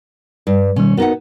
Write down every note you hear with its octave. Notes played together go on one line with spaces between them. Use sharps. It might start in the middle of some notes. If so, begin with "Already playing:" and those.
G2
B2 D#3 G3 C#4
B3 D#4 F#4 A#4 F#5